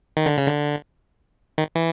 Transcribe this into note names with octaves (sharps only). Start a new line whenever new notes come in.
D#3
D3
C#3
D3
D#3
E3